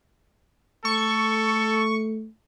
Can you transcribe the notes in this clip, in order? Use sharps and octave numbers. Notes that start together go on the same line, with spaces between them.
A3 A4 C#6